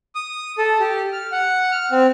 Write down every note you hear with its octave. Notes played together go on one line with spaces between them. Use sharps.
D#6
A4
G4
F6
F#5
F6
C4